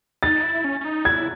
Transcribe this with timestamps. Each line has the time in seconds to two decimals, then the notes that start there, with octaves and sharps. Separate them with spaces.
0.23 D#4 A6
0.43 E4
0.64 C#4
0.81 C#4
0.85 D#4
1.05 E4 G#6